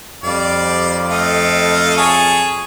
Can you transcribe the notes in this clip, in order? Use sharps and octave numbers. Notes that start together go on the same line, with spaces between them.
F2 G3 D5 F5
A3 D#5 F5
G#4 C#5 A5